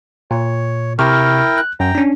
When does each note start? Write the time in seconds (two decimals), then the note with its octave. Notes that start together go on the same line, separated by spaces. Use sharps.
0.31 A#2 C#5
0.99 C3 E4 A#4 G5 C#6 F6
1.58 F#6
1.80 F#2 G5 A#5
1.95 C#4 D4